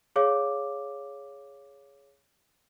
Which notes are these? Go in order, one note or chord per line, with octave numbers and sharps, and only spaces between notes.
G#4 C#5 F5 D6